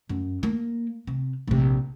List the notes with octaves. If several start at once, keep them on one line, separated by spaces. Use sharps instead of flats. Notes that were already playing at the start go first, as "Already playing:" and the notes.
F#2
A#3
C3
A#1 C3